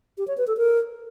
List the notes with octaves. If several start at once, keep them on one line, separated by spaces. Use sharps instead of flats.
G4
C#5
B4
A4
A#4